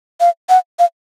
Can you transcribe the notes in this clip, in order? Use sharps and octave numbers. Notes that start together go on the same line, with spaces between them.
F5
F#5
F5